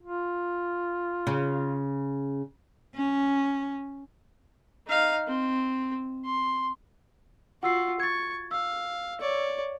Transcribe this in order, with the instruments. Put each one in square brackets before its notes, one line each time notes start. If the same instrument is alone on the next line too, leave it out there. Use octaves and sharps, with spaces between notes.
[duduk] F4
[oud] C#3
[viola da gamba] C#4
[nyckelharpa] D#4 F5
C4
C6
[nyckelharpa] F4 F#4 [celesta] F#5 E6 C7
[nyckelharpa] C#6 [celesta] G#6 A6
[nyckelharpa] F5 [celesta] E6
[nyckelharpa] C#5 D5